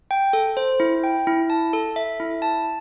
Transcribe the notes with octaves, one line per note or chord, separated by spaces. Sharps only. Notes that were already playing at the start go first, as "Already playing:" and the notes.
G5
A4
C5
E4
G5
E4
A5
A4
E5
E4
A5